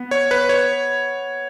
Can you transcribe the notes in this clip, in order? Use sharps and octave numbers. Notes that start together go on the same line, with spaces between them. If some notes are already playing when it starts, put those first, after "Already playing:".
Already playing: B3
C#5
B4
C#5